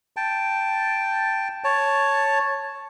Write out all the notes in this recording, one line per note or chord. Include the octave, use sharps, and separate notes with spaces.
G5 A5
C#5 A5